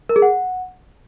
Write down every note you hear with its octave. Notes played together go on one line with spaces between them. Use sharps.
A#4
G#4
F#5